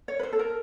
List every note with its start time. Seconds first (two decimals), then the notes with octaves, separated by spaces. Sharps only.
0.08 C#5
0.19 B4
0.23 C5
0.33 A4
0.39 A#4